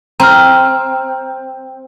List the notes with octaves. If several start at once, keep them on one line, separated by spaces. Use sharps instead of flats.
C4 A#5 F6